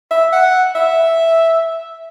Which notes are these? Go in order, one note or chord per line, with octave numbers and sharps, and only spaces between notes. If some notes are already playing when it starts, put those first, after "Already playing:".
E5
F#5
E5